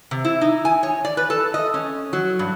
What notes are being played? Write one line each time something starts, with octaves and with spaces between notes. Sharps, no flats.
C3
E4
D#4
G#5
C#5
D5
B4
A4
D#5
C#4
F#3
G2